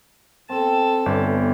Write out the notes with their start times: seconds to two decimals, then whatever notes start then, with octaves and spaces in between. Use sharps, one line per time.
0.50 C4 A4 A5
1.06 G1 B3 D5 E5